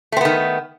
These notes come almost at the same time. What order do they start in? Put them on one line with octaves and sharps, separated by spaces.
A3 C4 B3 D#3